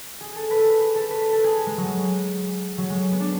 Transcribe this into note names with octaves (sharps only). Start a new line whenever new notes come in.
G#4
A4
B4
A4
G#4
B4
A4
B4
B4
A4
G#4
G#3
F#3
G#3
F#3
G#3
B3
D4